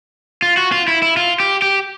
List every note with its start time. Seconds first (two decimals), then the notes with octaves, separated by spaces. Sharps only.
0.42 F4
0.57 F#4
0.72 F4
0.88 E4
1.02 E4
1.17 F4
1.40 G4
1.62 G4